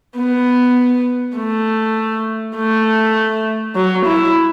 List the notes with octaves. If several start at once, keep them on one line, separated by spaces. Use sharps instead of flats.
B3
A3
A3
F#3
E4